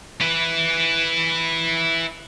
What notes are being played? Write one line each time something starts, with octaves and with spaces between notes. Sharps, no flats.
E4 B4